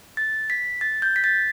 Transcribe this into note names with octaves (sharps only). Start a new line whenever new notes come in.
A6
B6
A6
G6
B6
A6